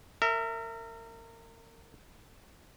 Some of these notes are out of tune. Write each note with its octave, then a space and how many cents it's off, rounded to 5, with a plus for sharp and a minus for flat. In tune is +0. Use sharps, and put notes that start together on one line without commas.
A#4 -30 E5 +0